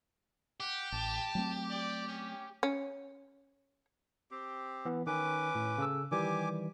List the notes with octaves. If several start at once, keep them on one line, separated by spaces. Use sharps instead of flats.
G4 F#5
A1 A5
F#3 A3 C4
D5
C#4
C#4
C4 G4
E3 B3
D#3 C#4 B4 D6
A2
C#3 A4 E6
D#3 E3 G3 G4 G#5 D6